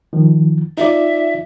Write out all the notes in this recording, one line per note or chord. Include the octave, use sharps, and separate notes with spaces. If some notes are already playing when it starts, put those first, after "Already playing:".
D#3 F3
D#4 F4 D5 E5